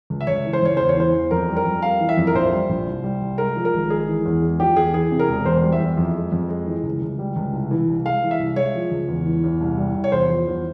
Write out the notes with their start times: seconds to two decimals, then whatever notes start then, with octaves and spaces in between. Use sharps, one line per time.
0.10 C#2
0.21 E5
0.27 C#2 C#5
0.45 E3
0.53 C5
0.62 C#2 C#5
0.77 E2 C5
0.89 C#5
0.97 E3 C5
1.14 E2
1.31 F2 A#4
1.49 G3
1.57 A#4
1.65 F2
1.82 G3 F5
2.00 E3
2.09 E5
2.17 F2
2.27 A#4
2.34 A#1 C5
2.52 G3
2.69 A#1
2.87 C2
3.04 G3
3.22 C2
3.38 G#3 A#4
3.56 F3
3.65 A#4
3.74 G#1
3.90 G#3 G#4
4.08 E3
4.25 E2
4.42 G#3
4.59 F3 G4
4.76 E2 G#4
4.94 E3 G#4
5.11 C3
5.19 A#4
5.29 E1
5.45 E2 C5
5.64 G3
5.72 E5
5.80 E2
5.97 F2
6.15 G#3
6.32 F2
6.49 G#3
6.67 E3
6.84 C#2
7.02 C#2
7.19 G3
7.36 C#2
7.53 C2
7.71 E3
7.88 C2
8.06 G#3 F5
8.23 E3
8.31 E5
8.39 C2
8.56 G#3 C#5
8.75 F3
8.91 C#2
9.08 E2
9.26 E3
9.44 E2
9.60 C2
9.78 G3
9.94 C2
10.04 C#5
10.12 E2 C5
10.29 F3
10.48 E2